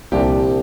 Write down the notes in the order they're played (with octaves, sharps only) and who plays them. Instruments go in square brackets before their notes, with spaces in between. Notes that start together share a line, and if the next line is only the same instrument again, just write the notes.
[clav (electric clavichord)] C2 A#2 F3 D4 [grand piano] G4